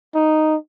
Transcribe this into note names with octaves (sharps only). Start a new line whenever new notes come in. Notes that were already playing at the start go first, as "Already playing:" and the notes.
D#4